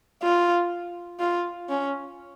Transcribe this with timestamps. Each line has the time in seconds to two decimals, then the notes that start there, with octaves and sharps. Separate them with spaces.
0.22 F4
1.20 F4
1.69 C#4